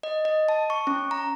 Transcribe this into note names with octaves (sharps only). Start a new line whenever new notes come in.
D#5
D#5
A5
C#6
C#4
A#5